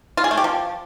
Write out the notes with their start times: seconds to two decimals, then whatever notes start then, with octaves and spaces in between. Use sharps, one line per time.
0.17 F4
0.24 G#4
0.31 A3
0.37 G4
0.44 F3